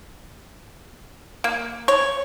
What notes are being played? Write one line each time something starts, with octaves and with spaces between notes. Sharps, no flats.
A#3
C#5